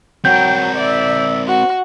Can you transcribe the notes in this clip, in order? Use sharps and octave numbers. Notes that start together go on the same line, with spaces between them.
F#3 C4 A#4 G5 G6
D5 E5
F#4